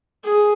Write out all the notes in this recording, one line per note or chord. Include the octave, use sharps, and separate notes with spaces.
G#4